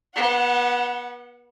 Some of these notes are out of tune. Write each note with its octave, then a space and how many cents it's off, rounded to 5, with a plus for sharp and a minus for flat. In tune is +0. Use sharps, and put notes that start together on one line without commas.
B3 -30 F#5 +0